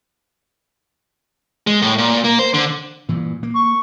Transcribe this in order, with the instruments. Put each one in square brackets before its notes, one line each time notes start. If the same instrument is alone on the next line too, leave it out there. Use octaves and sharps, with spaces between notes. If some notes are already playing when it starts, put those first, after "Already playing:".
[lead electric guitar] G#3
A2
A#2
A#3
C5
D3
[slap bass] G2 A#2 E3
A#3
[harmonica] C#6